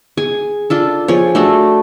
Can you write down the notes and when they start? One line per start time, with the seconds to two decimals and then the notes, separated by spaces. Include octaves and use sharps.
0.17 G#4 G#5
0.70 D4 F4 A4
1.08 F3 G#4 C#5
1.35 A3 D4 F#4 A4